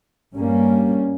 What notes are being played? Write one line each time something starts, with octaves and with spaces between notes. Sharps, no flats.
G2 G3 A#3 C#4